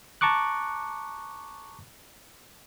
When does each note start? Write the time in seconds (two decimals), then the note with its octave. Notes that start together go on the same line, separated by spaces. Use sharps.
0.21 A5 A#5 C#6 D6 F#6